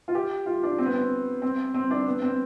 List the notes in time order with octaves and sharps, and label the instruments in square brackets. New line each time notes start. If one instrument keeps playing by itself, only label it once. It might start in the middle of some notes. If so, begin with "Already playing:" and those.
[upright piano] F4
G4
F4
D4
C4
B3
C4
C4
C4
D4
B3
C4